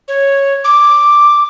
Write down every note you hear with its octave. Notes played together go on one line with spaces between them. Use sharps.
C#5
D6